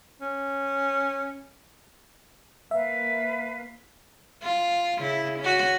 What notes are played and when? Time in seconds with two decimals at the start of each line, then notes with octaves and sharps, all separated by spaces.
0.21 C#4
2.71 A#3 B4 E5 F5
4.43 F4
4.98 C#3 E4
5.39 C#4 F#4